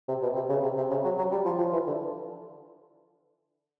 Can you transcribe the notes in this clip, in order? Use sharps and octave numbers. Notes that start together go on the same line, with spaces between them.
C3
B2
C3
C#3
C3
C3
C#3
F#3
F#3
G3
F3
F3
E3
D3